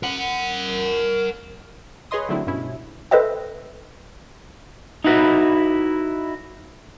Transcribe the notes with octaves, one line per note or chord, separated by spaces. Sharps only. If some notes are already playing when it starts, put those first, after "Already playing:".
A#4 F#5
G#4 B4 C#5 D#5 C6 D#6
D3 F#3 A3 C4 D4 E4
G2 B2 C#4 E4
A4 B4 C5 D#5 E5 G5
D#4 E4 F#4 B4